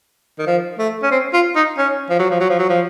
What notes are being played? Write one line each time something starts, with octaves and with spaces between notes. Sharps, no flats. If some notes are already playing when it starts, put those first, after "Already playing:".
D#3
F3
A3
C#4
C4
F4
D#4
C#4
F3
F#3
F3
F#3
F3
F#3
F3